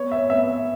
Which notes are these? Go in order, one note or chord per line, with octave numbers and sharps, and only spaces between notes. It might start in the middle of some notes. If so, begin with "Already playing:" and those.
Already playing: B3 C#5
E5
B3 E5